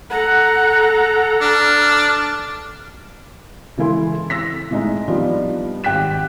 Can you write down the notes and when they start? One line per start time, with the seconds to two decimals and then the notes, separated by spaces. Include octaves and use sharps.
0.10 A4 F#5 A#5
1.41 D4 F6
3.78 C#3 E3 G#3 E4 A4 C6
4.30 E6 A#6 B6
4.71 A2 G#3 D#4
5.08 F3 G3 B3 D4 D#4 F4
5.84 G#1 G4 G5 F#6 B6 E7